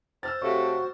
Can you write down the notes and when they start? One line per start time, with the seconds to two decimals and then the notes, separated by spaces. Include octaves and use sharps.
0.23 C5 E6 F6 A6
0.42 C3 A3 F#4 A4 C#5 F5 C#6